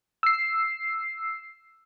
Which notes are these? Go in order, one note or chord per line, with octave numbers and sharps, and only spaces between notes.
E6 C7